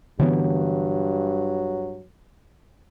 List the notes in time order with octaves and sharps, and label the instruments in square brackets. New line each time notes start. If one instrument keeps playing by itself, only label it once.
[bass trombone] G2 [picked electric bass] D3 E3 B3 [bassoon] F#3